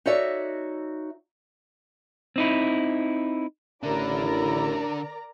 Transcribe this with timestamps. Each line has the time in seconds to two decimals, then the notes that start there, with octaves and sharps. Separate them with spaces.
0.06 D#4 F#4 A4 C#5 D5 E5
2.36 C4 D#4 E4
3.83 A1 D3 D4 E4 A#4 D5 A#5